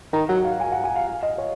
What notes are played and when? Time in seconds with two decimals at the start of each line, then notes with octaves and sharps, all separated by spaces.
0.13 D#3 A#5
0.29 F#3 F#5
0.44 F5
0.60 G#5
0.72 F#5
0.84 G#5
0.96 F5
1.07 F5
1.23 D#5
1.38 C#5